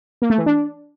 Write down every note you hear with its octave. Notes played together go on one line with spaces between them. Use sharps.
A#3
A3
E3
D4